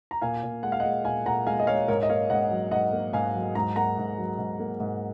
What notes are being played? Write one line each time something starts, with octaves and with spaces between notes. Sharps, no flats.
A#5
A#2 F5 G#5
A#2
G#3 F#5
F5
D#5 F#5
G#3
A#2 F5 G#5
A#2 F#5 A#5
G#3 F5 G#5
D#5
G#3 C#5 F5
G#2 A#4 C#5
D#5
A#3 C#5 F5
G#2 D#5 F#5
F#3
G#2 D#5 F#5
A#3
G#2 F5 G#5
F#3
G#2 A#5
A#3 F#5 A#5
G#2
F#3
G#2
A#3
G#2